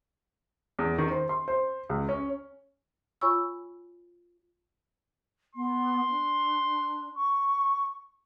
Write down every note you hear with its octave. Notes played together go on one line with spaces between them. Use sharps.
E2
D#3
C5
C6
C5
C#2
C#4
F4 C#5 G#5 B5 C#6 E6
B3 C6
D4
C#6